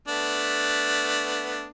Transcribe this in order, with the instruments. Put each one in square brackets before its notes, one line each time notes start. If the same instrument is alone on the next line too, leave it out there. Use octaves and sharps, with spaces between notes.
[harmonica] A3 B3 D4